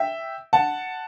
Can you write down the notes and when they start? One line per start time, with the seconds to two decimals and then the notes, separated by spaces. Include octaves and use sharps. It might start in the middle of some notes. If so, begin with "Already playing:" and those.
Already playing: E5 G5
0.53 F#5 A5